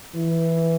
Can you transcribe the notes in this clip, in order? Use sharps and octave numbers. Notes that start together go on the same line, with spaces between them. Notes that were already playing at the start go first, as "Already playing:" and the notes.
E3